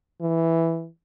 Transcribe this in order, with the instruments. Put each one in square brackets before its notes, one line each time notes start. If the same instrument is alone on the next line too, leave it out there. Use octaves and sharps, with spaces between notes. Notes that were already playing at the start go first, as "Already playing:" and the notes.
[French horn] E3